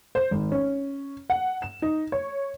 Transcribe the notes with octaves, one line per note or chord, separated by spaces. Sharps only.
C5
G#1
C#4
F#5
E7
D#4
C#5